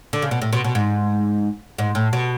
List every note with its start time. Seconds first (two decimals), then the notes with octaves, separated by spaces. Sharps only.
0.13 D3
0.22 C#3
0.31 B2
0.42 A2
0.53 B2
0.64 B2
0.75 G#2
1.78 G#2
1.95 A2
2.13 B2